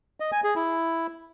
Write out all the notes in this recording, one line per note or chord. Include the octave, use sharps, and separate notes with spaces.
D#5
G#5
G#4
E4